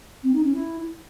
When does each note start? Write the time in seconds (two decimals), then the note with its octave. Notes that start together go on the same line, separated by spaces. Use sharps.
0.23 C4
0.34 D#4
0.44 C#4
0.54 E4